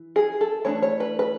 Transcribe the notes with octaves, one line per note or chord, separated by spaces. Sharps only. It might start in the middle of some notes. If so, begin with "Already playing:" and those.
Already playing: E3
G#4
A4
E3 A3 D4 C#5
C#5
B4
B4